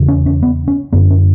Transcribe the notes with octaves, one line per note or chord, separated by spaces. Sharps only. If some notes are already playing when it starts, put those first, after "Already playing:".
Already playing: E2 C#3
C#4
C#4
B3
C#4
F#2 D3 B3
C#4